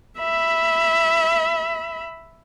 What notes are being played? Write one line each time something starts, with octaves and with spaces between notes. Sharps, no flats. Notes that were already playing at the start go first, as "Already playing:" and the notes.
E5 B5